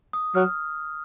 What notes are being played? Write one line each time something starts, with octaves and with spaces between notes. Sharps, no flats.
D#6
F#3 F6